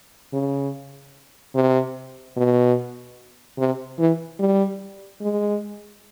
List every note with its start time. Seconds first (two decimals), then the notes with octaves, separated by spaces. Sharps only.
0.33 C#3
1.55 C3
2.37 B2
3.58 C3
3.99 E3
4.40 G3
5.21 G#3